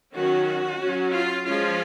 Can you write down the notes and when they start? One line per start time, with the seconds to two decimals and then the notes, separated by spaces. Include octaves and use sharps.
0.15 D#3 F#3 C#4 F#4
0.81 C#4
0.86 F#3
1.14 F4
1.46 F3 G#3 C#4 F4